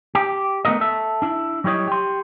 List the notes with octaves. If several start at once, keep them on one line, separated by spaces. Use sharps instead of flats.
G4
A3 B3 D4 A#4 D#5
A4 E5
D4 E4
F#3 G3 E4 C#5 D#5
G4 C6